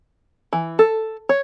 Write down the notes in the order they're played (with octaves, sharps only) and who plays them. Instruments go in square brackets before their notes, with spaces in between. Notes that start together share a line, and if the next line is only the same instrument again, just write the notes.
[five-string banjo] E3
A4
C#5